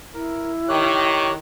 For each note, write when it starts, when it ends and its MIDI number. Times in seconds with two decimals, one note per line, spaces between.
0.14 1.36 64
0.14 0.52 70
0.68 1.35 51
0.68 1.33 67
0.68 1.33 73
0.68 1.33 90